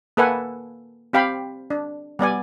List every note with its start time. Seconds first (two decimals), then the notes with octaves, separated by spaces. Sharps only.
0.17 A#3 A4 B4 E5 F#5 G#5
1.13 C4 G4 F5 G5 B5
1.70 D4
2.19 G3 B3 D5 G#5